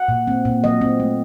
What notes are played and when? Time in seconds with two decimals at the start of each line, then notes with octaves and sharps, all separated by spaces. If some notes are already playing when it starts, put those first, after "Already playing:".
Already playing: F#5
0.08 A#2
0.27 C4
0.45 A#2
0.64 F#3 D#5
0.81 C4
1.00 A3